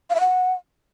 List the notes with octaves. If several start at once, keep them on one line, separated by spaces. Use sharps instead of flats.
F5
E5
F#5